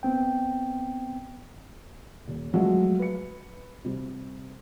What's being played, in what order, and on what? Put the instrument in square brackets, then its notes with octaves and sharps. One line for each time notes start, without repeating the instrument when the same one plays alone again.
[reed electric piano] B3 C4 G5
[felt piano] D#1
F3 F#3 G#3 A3
B4 C#7
C3 G3